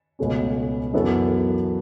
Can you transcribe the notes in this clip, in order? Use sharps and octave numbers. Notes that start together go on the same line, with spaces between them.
C#2 B2 A3 C#4
F#2 E3 B3 F#4 A4